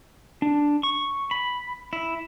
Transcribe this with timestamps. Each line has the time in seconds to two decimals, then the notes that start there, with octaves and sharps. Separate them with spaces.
0.42 D4
0.83 C#6
1.31 B5
1.93 E4